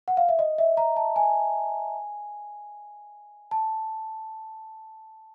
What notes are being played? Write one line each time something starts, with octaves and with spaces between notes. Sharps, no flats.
F#5
F5
E5
D#5
E5
A#5
A5
G#5
A5